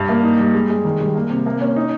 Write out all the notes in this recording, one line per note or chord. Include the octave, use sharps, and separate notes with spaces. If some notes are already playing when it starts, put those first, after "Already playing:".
Already playing: G2
A#3
D#4
G3
G#3
G#3
D#3
G3
A#3
C3
A#3
C#4
D#4